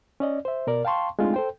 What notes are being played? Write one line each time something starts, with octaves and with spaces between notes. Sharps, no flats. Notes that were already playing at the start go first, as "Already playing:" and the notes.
C#4 D5 D#5
C5 E5
B2 A#4 D5
F5 G5 A5 C6 C#6
G#3 A3 C4 D4 D#4 F4
A4 C5 G5